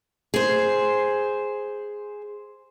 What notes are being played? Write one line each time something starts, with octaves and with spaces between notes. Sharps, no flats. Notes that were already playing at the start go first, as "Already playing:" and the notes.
G#4 C5